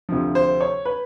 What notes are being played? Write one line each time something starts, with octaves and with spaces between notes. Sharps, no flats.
D2 C3 F3
C5
C#5
B4